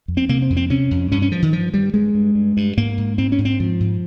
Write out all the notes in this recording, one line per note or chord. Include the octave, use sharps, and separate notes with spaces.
F2
C4
C3 A#3
C4
F2
C4
C3 C#4
F2
G2 C#4
C#4
G2 F3
D#3
G2 F3
G2 G3
G2 G#3
G2
G2
G2
G#2 A#3
G#2
G#2 C4
C#4
G#2
C4
G#2 F3
G#2